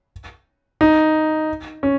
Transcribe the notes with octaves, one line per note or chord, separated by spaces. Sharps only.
D#4
C#4